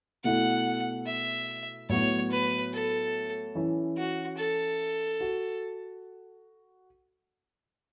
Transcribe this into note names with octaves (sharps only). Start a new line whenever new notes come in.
B2 A3 E4 F#5
E5
A2 F#3 B3 F#4 C#5
B4
A4
E3 C#4 E4
F#4
A4
F#4